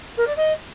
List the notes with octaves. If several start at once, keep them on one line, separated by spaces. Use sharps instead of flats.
A#4
D5
D#5